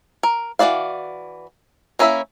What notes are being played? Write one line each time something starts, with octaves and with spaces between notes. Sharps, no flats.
A#4
E3 D4 F#4 D5 F5
A#3 C#4 E4 B4 E5